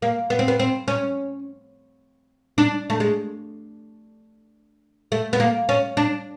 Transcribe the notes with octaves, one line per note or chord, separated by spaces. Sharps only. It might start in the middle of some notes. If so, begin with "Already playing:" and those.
A#3
B3
C4
B3
C4
C#4
D4
A3
G#3
A3
B3
A#3
C#4
D4